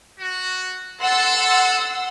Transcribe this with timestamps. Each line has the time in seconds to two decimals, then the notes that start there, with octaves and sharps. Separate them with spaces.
0.19 F#4
1.00 A4 F#5 C6 E6